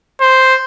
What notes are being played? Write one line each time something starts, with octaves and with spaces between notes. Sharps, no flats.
C5